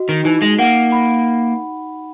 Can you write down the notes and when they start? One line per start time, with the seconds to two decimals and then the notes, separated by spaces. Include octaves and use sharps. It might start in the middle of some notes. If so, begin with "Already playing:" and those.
Already playing: F#4 D#5
0.09 D#3
0.25 E3 D#4
0.42 G#3
0.59 A#3 F#5
0.92 B5